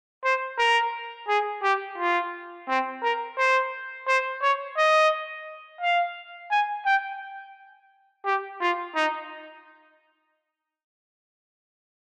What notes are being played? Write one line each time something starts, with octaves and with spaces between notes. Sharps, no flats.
C5
A#4
G#4
G4
F4
C4
A#4
C5
C5
C#5
D#5
F5
G#5
G5
G4
F4
D#4